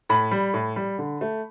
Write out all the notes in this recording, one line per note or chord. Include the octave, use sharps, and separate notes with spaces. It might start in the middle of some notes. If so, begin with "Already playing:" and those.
A2 B5
G3
A2
G3
D3
A3